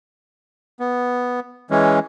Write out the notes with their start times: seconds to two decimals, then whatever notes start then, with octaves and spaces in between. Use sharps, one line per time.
0.80 B3
1.71 E3 G#3 C#4